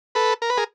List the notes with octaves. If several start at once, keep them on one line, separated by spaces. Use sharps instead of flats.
A4 B4
A#4
B4
G#4 A#4